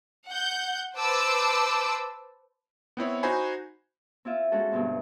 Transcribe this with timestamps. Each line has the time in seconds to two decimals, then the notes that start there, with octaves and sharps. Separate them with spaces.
0.28 F#5 G6
0.97 B4 C5 A5 D6 E6
2.97 B3 C4 E4 C#5
3.23 D#4 F#4 C5 G#5 B5
4.25 C4 E4 F4 E5
4.52 G#3 C#4 F#4 A4
4.72 D2 G2 B2 C4